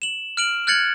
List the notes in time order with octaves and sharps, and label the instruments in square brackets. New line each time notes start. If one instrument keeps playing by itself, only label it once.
[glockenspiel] E7 F#7
F6 D7 F#7
F6 F#6 G#6 A6 C#7 F#7